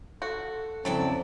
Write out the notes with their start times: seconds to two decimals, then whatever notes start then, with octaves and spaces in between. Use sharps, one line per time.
0.22 F#4 A4
0.85 F2 C#3 F#3 C4 E4 D5 A5